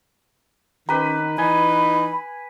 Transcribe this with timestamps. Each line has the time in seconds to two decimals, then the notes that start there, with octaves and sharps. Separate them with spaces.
0.89 D#3 C#4 G4 B4 A#5
1.38 E3 D#4 B4 G#5 B5